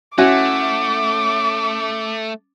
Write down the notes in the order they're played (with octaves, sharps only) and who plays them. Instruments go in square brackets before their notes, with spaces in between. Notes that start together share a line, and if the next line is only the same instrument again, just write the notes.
[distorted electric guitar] A3 [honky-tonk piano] C#4 [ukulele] E4 F#4 G#5 [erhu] D6